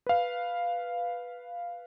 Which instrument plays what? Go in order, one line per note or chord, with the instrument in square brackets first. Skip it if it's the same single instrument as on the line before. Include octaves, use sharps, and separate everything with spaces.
[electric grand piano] B4 F5